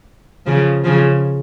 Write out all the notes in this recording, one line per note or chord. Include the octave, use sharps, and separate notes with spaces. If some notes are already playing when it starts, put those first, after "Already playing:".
C#3 F3
C#3 F3